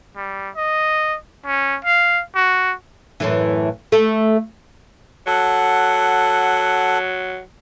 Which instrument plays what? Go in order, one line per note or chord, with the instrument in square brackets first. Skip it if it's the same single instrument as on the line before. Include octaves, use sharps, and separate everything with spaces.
[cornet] G3
D#5
C#4
F5
F#4
[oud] F#2 A2 E3
A3 A4
[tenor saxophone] F#3 [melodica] A4 F#5